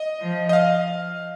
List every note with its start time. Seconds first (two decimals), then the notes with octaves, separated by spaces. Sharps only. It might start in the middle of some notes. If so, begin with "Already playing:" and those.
Already playing: D#5
0.21 F3
0.49 D#5
0.53 F5